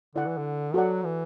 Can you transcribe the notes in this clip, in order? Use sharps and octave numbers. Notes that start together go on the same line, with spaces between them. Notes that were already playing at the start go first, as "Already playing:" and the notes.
D3 E4 D5 F#5
E3
D3
F#3 F#4 A4 D5 F#5
E3